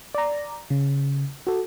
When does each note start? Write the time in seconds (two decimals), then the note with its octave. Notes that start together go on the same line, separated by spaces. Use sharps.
0.14 D5 A#5
0.70 C#3
1.47 F#4 A4